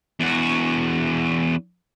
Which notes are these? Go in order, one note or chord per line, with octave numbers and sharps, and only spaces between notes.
E2 F#4